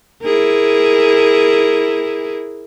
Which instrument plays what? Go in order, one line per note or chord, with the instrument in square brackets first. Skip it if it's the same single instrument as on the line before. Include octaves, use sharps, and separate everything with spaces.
[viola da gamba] E4 G#4 A#4